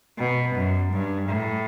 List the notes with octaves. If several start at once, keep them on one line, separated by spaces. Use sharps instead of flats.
B2
F#2
G2
A2